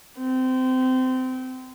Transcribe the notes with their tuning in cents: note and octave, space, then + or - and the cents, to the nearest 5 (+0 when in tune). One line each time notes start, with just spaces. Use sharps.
C4 -25